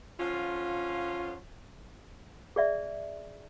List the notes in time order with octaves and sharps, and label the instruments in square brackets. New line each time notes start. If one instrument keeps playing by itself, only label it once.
[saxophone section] D3 F3 C#4 F4
[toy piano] G#4 D5 E5